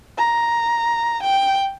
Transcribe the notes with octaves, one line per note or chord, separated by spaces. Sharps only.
A#5
G5